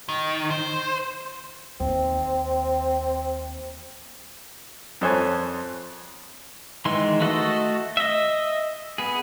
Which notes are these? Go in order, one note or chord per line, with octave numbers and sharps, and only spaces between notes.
D#3
C5
D#2 C4
F2 A4 C5 C#5 G#5 F#6
D#3 E3 G#3 C6
A3 F#4 A4 D#5
D#5 E5
B3 G#4